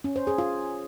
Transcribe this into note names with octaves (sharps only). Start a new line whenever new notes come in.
C#4
C5
G#4
F4